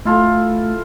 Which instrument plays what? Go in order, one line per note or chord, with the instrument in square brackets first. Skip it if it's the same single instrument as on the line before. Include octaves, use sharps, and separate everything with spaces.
[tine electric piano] A3 [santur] E4 F4 A4